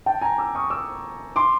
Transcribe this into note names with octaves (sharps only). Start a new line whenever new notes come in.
G5 A5
G#5 A#5
D6 E6
C#6 D#6
D6 E6
C6 D6